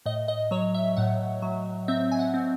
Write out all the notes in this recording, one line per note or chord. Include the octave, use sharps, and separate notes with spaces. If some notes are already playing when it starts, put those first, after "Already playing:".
A2 D#5
D#5
F#3 C#5
E5
A2 F#5
F#3
C4 E5
G#5
F#5
C4